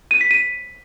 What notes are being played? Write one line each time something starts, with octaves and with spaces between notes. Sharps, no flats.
D#7
B6
D#7